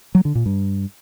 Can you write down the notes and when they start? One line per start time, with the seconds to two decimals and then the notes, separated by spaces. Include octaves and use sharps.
0.15 F#3
0.25 D3
0.35 A#2
0.46 G2